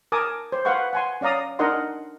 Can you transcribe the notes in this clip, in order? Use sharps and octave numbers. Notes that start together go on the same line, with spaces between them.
A#4 G#5 A5 D6 D#6
C5
B4 F5 F#5 C6 C#6
F#5 G#5 C6
C#4 D5 F5 A#5 D#6
D4 D#4 A#4 D#5 F#5 C6